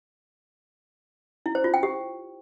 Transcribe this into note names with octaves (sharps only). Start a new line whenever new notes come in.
E4
C5
F4
G5
G4